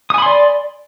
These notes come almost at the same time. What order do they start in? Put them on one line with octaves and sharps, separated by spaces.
D#6 G#5 B5 C6 D5